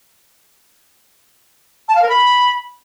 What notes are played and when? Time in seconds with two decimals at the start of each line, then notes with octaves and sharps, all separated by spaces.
1.88 A5
1.95 F5
2.02 A#4
2.09 B5